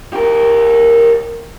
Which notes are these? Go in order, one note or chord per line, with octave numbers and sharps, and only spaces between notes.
G4 A#4